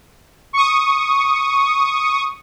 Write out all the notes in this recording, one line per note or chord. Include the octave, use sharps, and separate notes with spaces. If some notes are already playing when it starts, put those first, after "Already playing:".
C#6 D#6